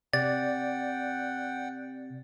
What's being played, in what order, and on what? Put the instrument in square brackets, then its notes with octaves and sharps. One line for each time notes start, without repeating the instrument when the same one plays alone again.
[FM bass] C3 [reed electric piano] D5 [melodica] F#5 G5 [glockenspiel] A6